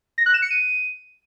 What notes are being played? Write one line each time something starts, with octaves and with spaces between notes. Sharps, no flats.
A#6
F#6
E7
C#7
D#7